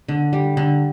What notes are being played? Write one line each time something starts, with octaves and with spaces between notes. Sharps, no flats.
D3
G3
D3